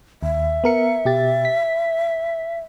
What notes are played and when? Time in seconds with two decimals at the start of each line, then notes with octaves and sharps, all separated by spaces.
0.23 D#2 E5
0.64 B3 A#4 C#7
1.05 B2 G4 A6
1.45 B6